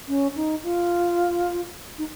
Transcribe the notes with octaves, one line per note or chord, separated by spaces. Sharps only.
C#4
D#4
F4
D#4